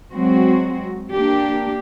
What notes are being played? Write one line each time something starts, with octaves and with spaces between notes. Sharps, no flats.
F#3 G#3 C4 F#4
A#3 D4 G4